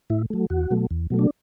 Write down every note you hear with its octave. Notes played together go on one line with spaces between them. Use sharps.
A2 E4
F#3 A3
E2 F#4
B2 F#3 A3
E2
B2 F#3 A3
D4